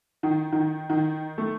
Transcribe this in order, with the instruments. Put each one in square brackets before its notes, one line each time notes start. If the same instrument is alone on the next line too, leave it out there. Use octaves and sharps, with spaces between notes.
[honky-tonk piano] D#3
D#3
D#3
A3